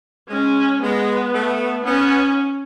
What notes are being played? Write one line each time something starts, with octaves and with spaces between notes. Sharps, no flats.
G#3 C#4
G#3 B3
A3
B3 C#4